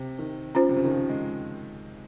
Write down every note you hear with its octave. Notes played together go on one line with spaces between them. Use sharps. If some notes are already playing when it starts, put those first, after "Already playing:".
Already playing: C3
D#3
C#4 F4 C5
C3
C#3
D#3
F3
G#3